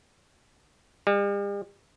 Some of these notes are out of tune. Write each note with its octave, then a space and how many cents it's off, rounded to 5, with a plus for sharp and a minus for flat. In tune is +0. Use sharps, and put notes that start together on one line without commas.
G3 +45